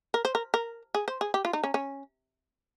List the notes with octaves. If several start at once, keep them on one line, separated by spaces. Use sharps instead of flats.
A#4
C5
A#4
A#4
G#4
C5
G#4
G4
F4
D#4
C#4
C#4